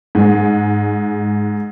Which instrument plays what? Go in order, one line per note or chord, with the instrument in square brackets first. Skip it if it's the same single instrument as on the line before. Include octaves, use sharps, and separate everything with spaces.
[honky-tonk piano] G#2 G#3